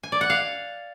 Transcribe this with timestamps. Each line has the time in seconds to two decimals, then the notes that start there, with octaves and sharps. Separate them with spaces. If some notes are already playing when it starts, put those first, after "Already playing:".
0.03 G#5
0.12 D5
0.21 F#5
0.30 F5